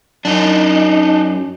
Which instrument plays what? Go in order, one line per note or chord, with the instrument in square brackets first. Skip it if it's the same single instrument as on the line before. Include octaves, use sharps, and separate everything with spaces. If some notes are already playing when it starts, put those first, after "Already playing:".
[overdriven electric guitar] F#2 [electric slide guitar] D4 D#4